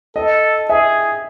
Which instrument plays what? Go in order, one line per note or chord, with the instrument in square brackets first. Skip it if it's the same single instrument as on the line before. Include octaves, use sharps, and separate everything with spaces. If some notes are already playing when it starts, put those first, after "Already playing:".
[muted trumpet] A4 [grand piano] D#5
[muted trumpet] G#4 [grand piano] E5